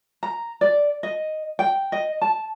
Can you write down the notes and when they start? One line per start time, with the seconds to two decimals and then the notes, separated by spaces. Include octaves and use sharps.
0.23 A#5
0.61 D5
1.03 D#5
1.59 G5
1.92 D#5
2.22 A5